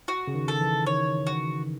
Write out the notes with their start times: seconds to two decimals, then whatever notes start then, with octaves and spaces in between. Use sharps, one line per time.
0.08 F#4
0.28 C#3
0.34 D#3
0.48 A4
0.61 E3
0.86 D#3 C#5
1.27 F#4